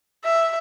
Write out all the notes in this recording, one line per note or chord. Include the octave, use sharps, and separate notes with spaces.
E5